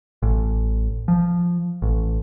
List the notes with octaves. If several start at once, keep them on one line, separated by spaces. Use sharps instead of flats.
A1
F3
A1